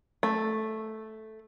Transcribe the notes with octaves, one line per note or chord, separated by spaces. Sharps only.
A3